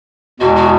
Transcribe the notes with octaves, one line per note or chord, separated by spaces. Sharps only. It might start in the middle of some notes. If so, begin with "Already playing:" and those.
E2 B2 G#3 F#4
F#4